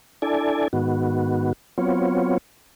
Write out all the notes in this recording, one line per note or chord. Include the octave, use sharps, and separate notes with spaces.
D4 E4 A4 D5 G#5
G#2 D#3 B3 F#4
F#3 B3 C4 F4 C#5